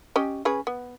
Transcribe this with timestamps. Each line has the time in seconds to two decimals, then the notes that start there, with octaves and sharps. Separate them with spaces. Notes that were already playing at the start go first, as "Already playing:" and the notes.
0.16 C#4 G4 D#5
0.45 C#4 G#4 B4
0.67 B3